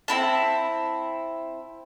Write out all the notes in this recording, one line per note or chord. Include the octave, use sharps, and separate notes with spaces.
C4 E4 A5